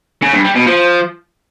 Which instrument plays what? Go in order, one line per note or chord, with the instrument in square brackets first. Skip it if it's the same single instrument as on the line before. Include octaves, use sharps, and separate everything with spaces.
[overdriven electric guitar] C#3
G2
G3
B2
F3